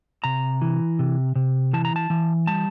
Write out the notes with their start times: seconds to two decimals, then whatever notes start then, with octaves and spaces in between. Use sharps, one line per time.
0.24 C3 A#5
0.62 E3
0.99 C3
1.36 C3
1.73 E3 A5
1.85 A#5
1.96 A5
2.10 E3
2.47 G3 A5